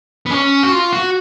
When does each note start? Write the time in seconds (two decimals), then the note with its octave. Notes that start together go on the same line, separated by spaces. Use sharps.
0.26 B3
0.31 C#4
0.63 F#4
0.72 F4
0.93 F#4